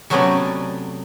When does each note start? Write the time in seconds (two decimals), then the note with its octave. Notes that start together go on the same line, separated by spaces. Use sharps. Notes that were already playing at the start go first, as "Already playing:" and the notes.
0.10 C3 F#3 A3 B3 C#4 D5